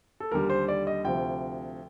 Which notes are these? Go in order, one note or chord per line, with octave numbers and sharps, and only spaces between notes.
A4
D#2 D3 G3 A#4
C5
D5
D#5
D2 C3 F3 G5